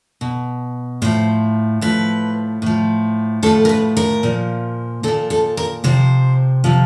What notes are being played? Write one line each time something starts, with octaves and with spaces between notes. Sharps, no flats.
B2
A2 F3 C5
A2 F3 B4
A2 F3
A2 F3 A4
A#4
B4
A#4
A#2 F3
A#2 F3 A4
A4
A#4
C3 F3 C5
C3 F3